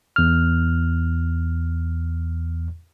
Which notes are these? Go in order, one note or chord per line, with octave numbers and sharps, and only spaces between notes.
E2 F6